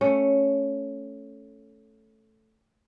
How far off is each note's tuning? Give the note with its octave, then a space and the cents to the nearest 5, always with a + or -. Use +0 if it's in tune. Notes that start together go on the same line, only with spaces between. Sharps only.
A3 +0 C#4 +0